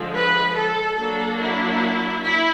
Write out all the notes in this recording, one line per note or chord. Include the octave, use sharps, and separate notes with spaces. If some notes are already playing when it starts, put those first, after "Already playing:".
Already playing: D3 F3 G#3
B4
A4
F#3 A#3 D4 A4
E4
E4